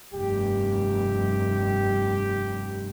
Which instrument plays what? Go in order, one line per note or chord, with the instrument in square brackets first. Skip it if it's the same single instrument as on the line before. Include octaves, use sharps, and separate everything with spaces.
[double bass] F1 G2 [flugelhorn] G4